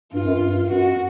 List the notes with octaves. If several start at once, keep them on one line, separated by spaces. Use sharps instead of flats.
G2 F4
F#2
G2
F#2 F#4